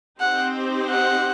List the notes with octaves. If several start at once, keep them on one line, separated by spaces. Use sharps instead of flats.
C4 D#4 G4 C5 F#5
F#5